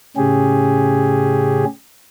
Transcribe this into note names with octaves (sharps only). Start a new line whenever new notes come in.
A2 C#3 C#4 G4 G#4